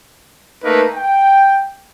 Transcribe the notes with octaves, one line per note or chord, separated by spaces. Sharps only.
A3 A#3 D#4 A#4 B4
G5